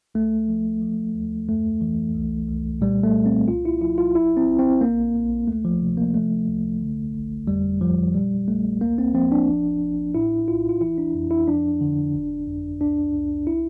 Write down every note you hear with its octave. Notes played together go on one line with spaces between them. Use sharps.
C2 A3
F3
F3
D2
F2 A3
E3
C2
C2
A#2 G3
A3
A#2
C4
C2 F4
E4
F3 E4
F4
A1 E4
C4
A1
C4
A#1 A#3
A#1
D2 A3
F3
C3
A#3
F3 A3
C2
D3
G1
F2 G3
F2 F3
A#2 G3
A#1 A3
D2 A#3
C4
F3 C4
D4
A1
A1
A2 E4
A#1 F4
F4
E3 E4
D4
F2
E4
F3 D4
D3
G1
F2
C2 D4
C2
E4